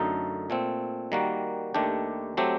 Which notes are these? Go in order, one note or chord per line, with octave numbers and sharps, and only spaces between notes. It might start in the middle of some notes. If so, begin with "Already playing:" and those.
Already playing: F#2 D3 A3 D#4
A#2 A3 C4
D#3 G3 A#3 F#4
D#2 D#3 A3 D4 G4
F#3 A3 C4 G4